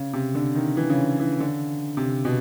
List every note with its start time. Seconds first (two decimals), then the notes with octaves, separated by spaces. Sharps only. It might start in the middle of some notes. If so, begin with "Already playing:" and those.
Already playing: C#3
0.13 C3
0.35 D3
0.55 D#3
0.77 E3
0.90 C#3
0.98 D3
1.20 E3
1.40 D3
1.97 C3
2.25 B2